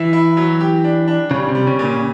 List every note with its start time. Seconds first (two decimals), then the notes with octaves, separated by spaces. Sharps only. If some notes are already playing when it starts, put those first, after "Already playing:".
Already playing: E3 E4
0.13 E4
0.37 F#3
0.60 G4
0.84 D4
1.08 D4
1.31 C#3 G3
1.49 C3
1.55 G3
1.67 C#3
1.79 A#2
1.85 C#3